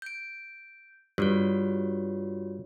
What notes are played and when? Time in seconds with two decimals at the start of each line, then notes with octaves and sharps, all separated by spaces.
0.02 G6 D7
1.18 G2 F4 F#4 C#5